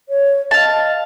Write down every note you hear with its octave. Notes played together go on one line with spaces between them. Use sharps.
C#5
D#5 F5 A5